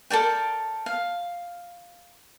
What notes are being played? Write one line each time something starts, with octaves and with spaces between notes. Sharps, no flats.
A4 A#4 D5 G5
F5